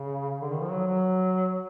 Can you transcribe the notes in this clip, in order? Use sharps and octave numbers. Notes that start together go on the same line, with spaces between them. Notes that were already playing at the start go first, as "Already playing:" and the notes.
Already playing: C#3
D3
D#3
F3
F#3
F#3